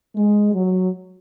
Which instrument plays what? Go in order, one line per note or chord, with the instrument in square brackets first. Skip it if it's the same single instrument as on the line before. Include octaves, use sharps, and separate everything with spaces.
[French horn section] G#3
F#3